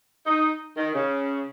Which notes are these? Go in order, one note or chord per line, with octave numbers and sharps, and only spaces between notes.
D#4
D#3
C#3